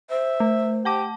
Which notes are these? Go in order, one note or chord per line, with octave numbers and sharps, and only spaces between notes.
C5 E5
A3
G4 F#5 A5 D6